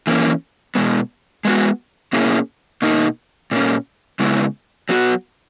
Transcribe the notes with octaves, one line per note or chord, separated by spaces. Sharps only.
E3 A#3 C#4
B2 G#3 B3
G#3 B3 F#4
B2 A#3 C#4 E4 G#4
B2 A#3 D#4
A#2 A#3 C#4
C#3 G#3 B3 E4
F#3 B3 F#4